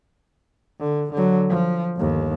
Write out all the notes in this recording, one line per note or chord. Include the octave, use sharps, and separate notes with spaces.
D3
D3 F#3
F3
G1 D#2